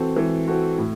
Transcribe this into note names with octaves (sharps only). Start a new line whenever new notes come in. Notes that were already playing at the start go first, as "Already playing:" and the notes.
Already playing: E3 C4 F#4 A4
E3
C4 F#4 A4
A2